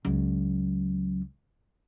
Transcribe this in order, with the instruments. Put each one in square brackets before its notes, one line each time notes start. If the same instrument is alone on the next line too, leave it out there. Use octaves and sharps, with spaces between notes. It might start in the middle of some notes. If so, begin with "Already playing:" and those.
[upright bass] C#2 F#3